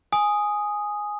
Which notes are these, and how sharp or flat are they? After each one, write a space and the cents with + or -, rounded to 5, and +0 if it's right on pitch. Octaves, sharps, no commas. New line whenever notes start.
G#5 +0 D#6 +0